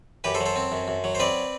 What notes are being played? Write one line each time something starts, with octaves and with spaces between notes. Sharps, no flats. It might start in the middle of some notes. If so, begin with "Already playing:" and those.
F#2 G4 B4
A4 C5
F#3
A4 C5
C4
F#2
F#2
F#3
C5
C4 B4 D5